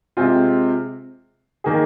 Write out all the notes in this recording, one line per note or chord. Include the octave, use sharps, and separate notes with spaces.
C3 G#3 C4 F4
D#3 A#3 G#4